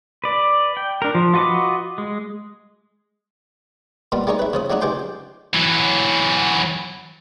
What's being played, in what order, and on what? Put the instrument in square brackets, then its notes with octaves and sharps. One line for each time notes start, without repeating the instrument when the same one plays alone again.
[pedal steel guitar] B4 D5
G5
D4 A#4
F3
F4 F#4 B4 D#5 D6
G#3
[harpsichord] B2 G3 A#3 B3 F4
G3 G#3 A#3 D#4 C#5
B4 E5
C#3 F3 D#6
F#3 A3 D4 D#4 F#4
C#2 G#3 G4 G5 C6
[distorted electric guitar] E3 F#3